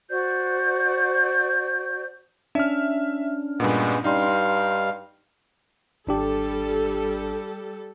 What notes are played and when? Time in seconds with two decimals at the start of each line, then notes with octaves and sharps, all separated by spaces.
0.10 F#4 C5 D5 G6
2.55 C#4 D4 E5 F6
3.60 G2 A#2 G#3 B3
4.04 G2 G3 D#4 F5 C6
6.07 G#1 G3 D4 G4 A4